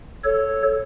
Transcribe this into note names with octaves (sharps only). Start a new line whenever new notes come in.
A4 C#5